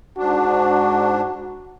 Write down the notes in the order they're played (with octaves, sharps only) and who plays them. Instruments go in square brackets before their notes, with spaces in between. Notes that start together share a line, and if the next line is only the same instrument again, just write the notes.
[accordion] G#2 D4 [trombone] F#4